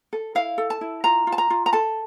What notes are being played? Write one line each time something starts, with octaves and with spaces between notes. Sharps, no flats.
A4
E4 F5
A4
A5
E4
F4 A#5
F4
A5
A#5
F4
A#5
A4 A5